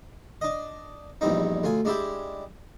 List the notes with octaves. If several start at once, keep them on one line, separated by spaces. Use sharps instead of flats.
D4 D#5
A#1 E2 G2 C4 D#4
D2 F4 G#5
G#3 D4 E4 G4